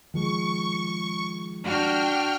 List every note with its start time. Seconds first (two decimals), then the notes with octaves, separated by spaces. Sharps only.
0.14 D#3 F3 G#3 C#6
1.64 D4 F#4 G5 F6